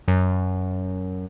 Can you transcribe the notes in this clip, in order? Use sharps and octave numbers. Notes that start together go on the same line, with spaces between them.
F#2